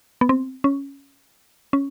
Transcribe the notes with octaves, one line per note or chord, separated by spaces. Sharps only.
B3
C4
C#4
C#4